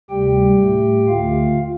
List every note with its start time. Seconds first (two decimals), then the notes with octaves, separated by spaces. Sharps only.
0.10 D2 C3 G3 G4 G5
0.59 A2 A3
1.08 D2 D3 A3 F4 F5